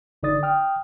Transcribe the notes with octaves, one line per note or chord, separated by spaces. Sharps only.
G1 D3 D#4 D5 D#6 A6
G5 D#6 F6